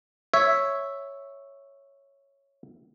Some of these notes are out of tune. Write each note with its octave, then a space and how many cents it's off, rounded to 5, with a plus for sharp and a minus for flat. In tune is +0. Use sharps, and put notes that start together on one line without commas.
C#5 +0 E5 +0